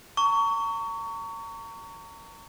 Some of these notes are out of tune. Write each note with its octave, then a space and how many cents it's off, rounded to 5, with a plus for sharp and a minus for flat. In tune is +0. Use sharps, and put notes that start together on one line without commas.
A#5 -35 C#6 +25